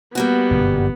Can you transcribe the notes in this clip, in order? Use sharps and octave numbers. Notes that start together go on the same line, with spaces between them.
G3 A#3 B3 F#4
G1 F#2 B2